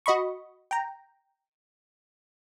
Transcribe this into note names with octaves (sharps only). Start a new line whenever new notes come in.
F#4 D#5 B5 C#6
G5 A#5